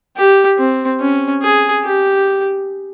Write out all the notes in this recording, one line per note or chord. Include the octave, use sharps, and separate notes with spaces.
G4
C4
C#4
G#4
G4